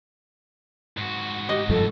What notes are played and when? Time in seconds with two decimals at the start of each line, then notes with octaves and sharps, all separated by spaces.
0.98 G#2 F#4
1.49 G4 D#5
1.69 F1 G2 F3 A4